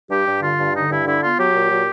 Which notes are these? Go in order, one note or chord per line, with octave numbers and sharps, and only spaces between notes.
G2 G4
G2
D3 F4
G2
D3 D#4
G2 E4
D3 E4
B3 F4
F#3 G4
A#2
F#3